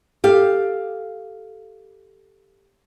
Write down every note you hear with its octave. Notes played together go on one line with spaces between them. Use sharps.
G4 A4 F5